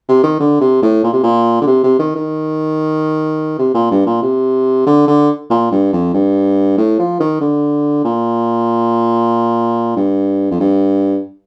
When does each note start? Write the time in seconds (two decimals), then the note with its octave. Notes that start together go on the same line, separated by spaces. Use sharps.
0.09 C3
0.24 D#3
0.40 D3
0.61 C3
0.83 A2
1.04 A#2
1.13 C3
1.23 A#2
1.61 D3
1.67 C3
1.84 C3
1.99 D#3
2.15 D#3
3.59 C3
3.75 A#2
3.91 G2
4.06 A#2
4.22 C3
4.87 D3
5.08 D3
5.50 A#2
5.72 G2
5.93 F2
6.14 G2
6.78 A2
6.99 F3
7.20 D#3
7.41 D3
8.05 A#2
9.96 G2
10.51 F2
10.60 G2